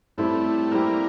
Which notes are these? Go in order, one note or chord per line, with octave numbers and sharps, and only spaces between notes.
A2 G3 A3 C4 E4 G4
A2 G3 A#3 C4 E4 G4